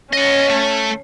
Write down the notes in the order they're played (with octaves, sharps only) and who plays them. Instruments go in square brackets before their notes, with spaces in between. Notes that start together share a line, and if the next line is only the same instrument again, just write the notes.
[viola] C#4 [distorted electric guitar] D#5 F#5
[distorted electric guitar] A3